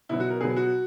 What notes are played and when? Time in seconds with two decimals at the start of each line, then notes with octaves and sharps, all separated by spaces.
0.09 B2 F#3 E4
0.20 F#4
0.30 A#4
0.41 B2 F#3 G#4
0.57 F#4